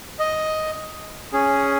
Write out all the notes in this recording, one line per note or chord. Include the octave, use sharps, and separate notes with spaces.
D#5
C#4 G#4